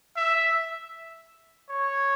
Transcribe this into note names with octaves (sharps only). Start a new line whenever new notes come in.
E5
C#5